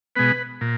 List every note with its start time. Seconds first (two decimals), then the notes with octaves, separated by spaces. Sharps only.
0.16 B2 G#3 B3 B4
0.61 A#2